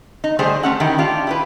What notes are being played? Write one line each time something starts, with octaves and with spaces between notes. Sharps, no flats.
D#4
D3 G3 A3 G#4 C5
A3 C#4 F#5
D#3 E4 G4
D4 F4 G4
E4 G4 B4